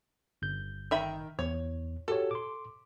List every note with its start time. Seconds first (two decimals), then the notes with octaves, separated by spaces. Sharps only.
0.42 G1 G6
0.91 D#3 E5 B5
1.39 E2 C#5
2.08 F#4 G4 A4 C#5
2.31 C6 D6